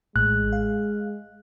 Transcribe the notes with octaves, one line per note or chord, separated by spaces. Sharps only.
A1 A2 G#3 F#6
F5